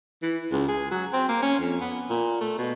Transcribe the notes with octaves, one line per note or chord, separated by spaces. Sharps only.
E3
C#2
G#4
F#3
C4
A#3
C#4
F2
B3
A#2
A3
B2